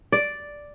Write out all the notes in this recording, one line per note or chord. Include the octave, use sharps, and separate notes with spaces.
D5